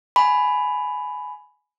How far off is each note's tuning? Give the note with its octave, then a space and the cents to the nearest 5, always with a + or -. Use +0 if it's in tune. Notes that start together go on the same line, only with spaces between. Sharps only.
G#5 +15 B5 +10